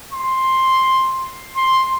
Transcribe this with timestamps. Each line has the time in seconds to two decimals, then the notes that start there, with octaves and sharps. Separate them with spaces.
0.13 C6
1.57 C6